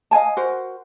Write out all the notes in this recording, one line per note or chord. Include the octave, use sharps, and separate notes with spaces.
D#5 F5 G#5 A5
F#4 A#4 C5